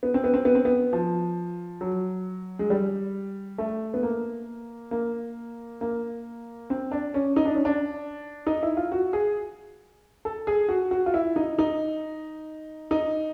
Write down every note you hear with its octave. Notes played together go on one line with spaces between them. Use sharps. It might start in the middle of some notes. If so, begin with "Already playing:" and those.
B3
C4
B3
C4
B3
C4
B3
F3
F#3
G#3
G3
A3
B3
A#3
A#3
A#3
C4
D4
C#4
D#4
D4
C#4
D4
D#4
E4
F4
F#4
G#4
A4
G#4
F#4
F#4
F4
E4
D#4
D#4
D#4